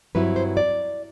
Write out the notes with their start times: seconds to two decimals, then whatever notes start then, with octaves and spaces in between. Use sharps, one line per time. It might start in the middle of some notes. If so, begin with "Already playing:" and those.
0.15 G2 F#3 C4 E4 B4
0.36 C5
0.57 D5